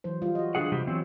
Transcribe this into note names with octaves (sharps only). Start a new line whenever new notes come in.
E3 F#3 C5
G3 F4
F#4 D#5
D3 G#4 F#5
C3 G3 G4
E3 F#3 B3 C4